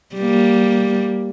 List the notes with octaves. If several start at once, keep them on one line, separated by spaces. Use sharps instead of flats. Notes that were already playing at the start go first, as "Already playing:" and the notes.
G3 A#3